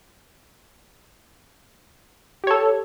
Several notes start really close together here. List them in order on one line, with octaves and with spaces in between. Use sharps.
G4 C#5 A4